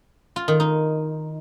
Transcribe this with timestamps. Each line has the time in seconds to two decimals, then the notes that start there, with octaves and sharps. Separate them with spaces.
0.36 F4
0.48 D#3
0.60 D#4